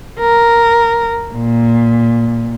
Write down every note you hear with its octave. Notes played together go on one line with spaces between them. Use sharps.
A#4
A#2